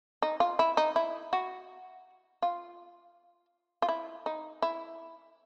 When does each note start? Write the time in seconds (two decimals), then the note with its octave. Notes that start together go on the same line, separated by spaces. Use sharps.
0.22 D#4
0.40 F4
0.59 E4
0.77 D#4
0.96 E4
1.33 F#4
2.42 F4
3.82 F4
3.88 E4
4.26 D#4
4.62 E4